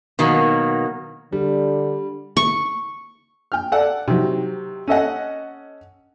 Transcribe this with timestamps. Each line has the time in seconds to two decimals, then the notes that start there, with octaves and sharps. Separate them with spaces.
0.19 B2 D#3 F#3 A#3
1.33 D3 G3
2.37 C#6
3.52 G5 F6
3.72 A4 D5 F#5
4.08 C3 D#3 F#3
4.88 C#4 A4 D#5 F#5